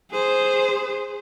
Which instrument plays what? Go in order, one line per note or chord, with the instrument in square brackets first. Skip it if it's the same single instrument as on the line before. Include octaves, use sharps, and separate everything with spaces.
[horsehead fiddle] G#4 C5